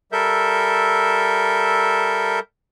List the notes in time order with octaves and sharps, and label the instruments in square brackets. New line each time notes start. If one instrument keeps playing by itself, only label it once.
[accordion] G3 A4 A#4 E5 G6